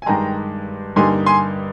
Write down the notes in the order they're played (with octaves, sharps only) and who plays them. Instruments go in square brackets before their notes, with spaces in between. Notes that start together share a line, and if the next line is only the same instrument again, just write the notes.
[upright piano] G#5
[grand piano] G2 D#3 G#3 [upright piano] G5 A#5
[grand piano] G2 D3 G3 A#3 D#4 [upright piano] G#5 C6
[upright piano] G#5 C6